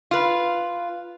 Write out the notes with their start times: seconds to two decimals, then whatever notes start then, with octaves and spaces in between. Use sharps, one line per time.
0.11 F4 B4